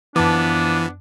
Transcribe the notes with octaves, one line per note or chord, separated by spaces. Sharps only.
F#2 E3 F3 B3 D4 A5 D6